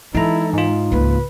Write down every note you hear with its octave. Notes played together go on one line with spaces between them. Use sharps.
E3 G#3 D#4 E4 A4 A#5
G#2 D#4 F4
C#2 A#3 B4